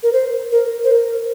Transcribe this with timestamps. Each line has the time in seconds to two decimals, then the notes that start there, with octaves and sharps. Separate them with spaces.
0.03 A#4
0.13 C5
0.52 A#4
0.84 C5
0.91 A#4